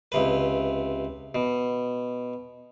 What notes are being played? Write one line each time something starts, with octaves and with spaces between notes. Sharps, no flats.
C#2 C3 B4
B2